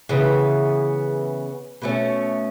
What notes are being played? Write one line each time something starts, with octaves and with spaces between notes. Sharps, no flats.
C#3 E3 B3
B2 A3 C#4